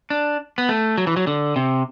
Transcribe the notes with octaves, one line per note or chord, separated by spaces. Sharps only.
D4
B3
A3
F#3
E3
F#3
D3
C3